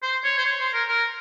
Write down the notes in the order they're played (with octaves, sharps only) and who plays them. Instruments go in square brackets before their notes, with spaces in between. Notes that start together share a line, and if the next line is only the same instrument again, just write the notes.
[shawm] C5
C#5
C5
C#5
C5
A#4
A#4